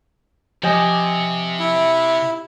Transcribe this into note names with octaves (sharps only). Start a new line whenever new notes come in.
C3 F3 G4 D#5 G#5
E4